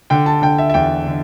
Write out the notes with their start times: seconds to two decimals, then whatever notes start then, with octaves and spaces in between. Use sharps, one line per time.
0.10 D3 G5
0.26 A5
0.42 D3 G5
0.58 E5
0.70 E5
0.74 E2 G5
1.07 D3